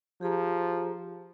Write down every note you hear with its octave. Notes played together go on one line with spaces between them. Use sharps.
F3 G4 G#4 A#5